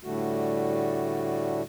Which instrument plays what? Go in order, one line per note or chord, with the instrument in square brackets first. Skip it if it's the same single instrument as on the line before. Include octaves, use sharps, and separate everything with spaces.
[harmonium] A2 D3 G3 A3 F#4